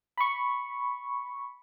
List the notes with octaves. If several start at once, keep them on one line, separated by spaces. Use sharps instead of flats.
B5 C#6